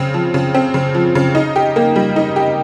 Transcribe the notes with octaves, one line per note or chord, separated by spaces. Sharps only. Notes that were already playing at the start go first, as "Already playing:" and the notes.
Already playing: C#3 C4
F3
C#3
C4
C#3
F3
C#3
D#4
G4
A#3
G3
D#4
G4